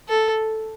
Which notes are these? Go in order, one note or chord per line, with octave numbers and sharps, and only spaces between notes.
A4